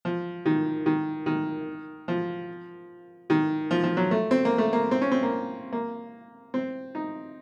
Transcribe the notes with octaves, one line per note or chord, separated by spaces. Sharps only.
F3
D#3
D#3
D#3
F3
D#3
F3
F3
F#3
A3
C4
A#3
A3
A#3
C4
C#4
C4
A#3
A#3
C4
D#4